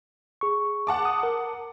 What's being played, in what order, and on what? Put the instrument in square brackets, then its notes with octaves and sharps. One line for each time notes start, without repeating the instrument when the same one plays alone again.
[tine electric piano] G#4 C#6
[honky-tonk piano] F#5 A5 D6
[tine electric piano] D#6
A#4